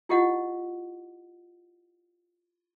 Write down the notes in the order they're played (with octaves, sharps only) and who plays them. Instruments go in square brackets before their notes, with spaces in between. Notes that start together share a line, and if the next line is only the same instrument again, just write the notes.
[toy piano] E4 F4 G4 D#5 F#5